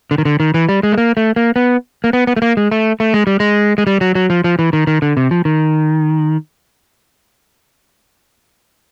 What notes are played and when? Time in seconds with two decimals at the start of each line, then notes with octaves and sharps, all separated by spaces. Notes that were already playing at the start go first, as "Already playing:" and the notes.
0.11 D3
0.18 D#3
0.25 D3
0.40 D#3
0.54 E3
0.69 G3
0.83 G#3
0.92 A3
0.98 A#3
1.17 A3
1.36 A#3
1.56 B3
2.04 A#3
2.13 B3
2.27 B3
2.37 A3
2.42 A#3
2.57 G#3
2.71 A3
3.00 A3
3.14 G#3
3.27 G3
3.40 G#3
3.78 G#3
3.87 G3
4.01 F#3
4.15 F#3
4.30 F3
4.44 F3
4.59 E3
4.73 D#3
4.87 D#3
5.02 D3
5.17 C3
5.31 F3
5.45 D#3